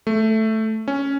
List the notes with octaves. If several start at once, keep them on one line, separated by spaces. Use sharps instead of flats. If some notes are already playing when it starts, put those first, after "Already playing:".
A3
C#4